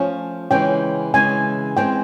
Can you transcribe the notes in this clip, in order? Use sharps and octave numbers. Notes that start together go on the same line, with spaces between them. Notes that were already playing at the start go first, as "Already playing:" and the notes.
Already playing: F3 A3 C#4
C#3 E3 G#3 C#4 G5
C#3 E3 G#3 C#4 G#5
E3 G#3 C4 G5